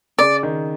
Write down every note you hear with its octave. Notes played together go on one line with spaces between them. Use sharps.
C#3 D5
D#3